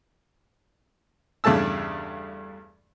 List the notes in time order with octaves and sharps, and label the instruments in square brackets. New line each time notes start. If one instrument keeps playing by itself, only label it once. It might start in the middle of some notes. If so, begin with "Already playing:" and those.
[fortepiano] E2 G2 C#3 A3 A5 E6